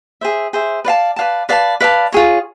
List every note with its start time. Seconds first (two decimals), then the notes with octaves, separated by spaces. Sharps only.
0.21 G#4 C5 E5
0.53 G#4 C5 E5
0.85 B4 D5 F5 A5
1.16 B4 D5 F5 A5
1.49 B4 D5 F5 A5
1.81 B4 D5 F5 A5
2.12 F4 G#4 C#5